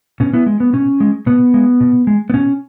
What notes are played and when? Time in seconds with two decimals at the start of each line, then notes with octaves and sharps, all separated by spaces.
0.20 B2 C#4
0.33 B3 E4
0.46 G#3
0.60 B3
0.73 B2 C#4
1.00 G#3
1.26 B2 B3
1.54 G#3
1.80 B2
2.07 G#3
2.30 B3
2.34 B2 C#4